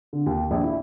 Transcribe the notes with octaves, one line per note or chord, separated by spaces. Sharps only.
D3
D#2
A#1
E4